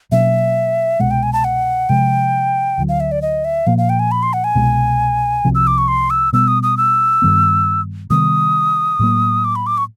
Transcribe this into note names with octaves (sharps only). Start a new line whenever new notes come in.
B2 F#3 A#3 C#4 E5
C2 B2 G#3 F#5
G5
G#5
A5
F#5
C3 F3 G#3 G5
D2 D3 F#3
F5
E5
D5
D#5
E5
A#2 F3 A#3 F5
F5
G5
G#5
B5
C6
F#5
G#5
C2 B2 G#3
C2 C3 F3
E6
D6
C#6
C6
E6
B2 G3 B3 E6
D#6
D#6
E6
G2 D#3 G3 B3
C3 D#3 G3 B3 D#6
A2 F#3 A#3
D6
B5
D6
C#6